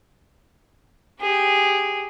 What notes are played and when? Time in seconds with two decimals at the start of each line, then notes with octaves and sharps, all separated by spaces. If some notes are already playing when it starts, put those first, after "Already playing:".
1.21 G4 G#4